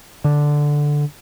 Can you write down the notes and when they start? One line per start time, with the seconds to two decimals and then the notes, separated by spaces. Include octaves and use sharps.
0.24 D3